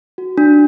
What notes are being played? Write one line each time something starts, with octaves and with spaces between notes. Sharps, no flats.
F#4
D4